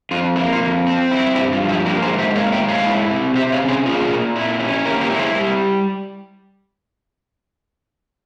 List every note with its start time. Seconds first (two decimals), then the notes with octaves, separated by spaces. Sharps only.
0.11 F2 F4
0.36 A#3 E4
0.53 F4
0.61 F2
0.86 C4
1.11 E4
1.35 G2 E4 G4
1.53 F4
1.61 F3
1.69 E4 G4
1.86 A#3 G4 A#4
2.02 G#4 C5
2.11 G#2
2.18 C5 E5
2.35 A#3 C#5 F5
2.52 E5 G5
2.61 G#2
2.68 C#5 F5
2.86 E4
3.11 C3
3.35 C3 C5 E5
3.52 C#5 F5
3.61 C#4
3.69 G#4 C5
3.86 A#2 F4 G#4
4.11 A#2
4.35 E4
4.60 C#4
4.85 A#3 G4 A#4
5.01 G4 A#4
5.10 E4 C#5
5.18 G#4 C5
5.35 G3